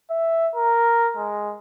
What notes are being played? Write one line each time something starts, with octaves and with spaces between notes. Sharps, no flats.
E5
A#4
G#3